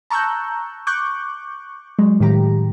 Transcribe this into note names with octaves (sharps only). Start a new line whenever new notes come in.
A5 A#5 C#6 E6 F#6 G6
C#6 D6 F#6 G6
F#3 G#3
A2 D#3 G4 A#5